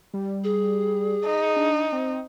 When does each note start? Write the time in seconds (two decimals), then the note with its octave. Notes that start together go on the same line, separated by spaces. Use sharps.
0.14 G3
0.44 G#4
1.25 D#4
1.56 D4
1.92 C4